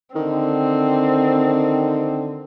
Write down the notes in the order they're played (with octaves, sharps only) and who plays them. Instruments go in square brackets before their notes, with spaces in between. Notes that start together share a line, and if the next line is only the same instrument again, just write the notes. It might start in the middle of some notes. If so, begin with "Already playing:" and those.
[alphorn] D3 [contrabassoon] D#3 [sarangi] C4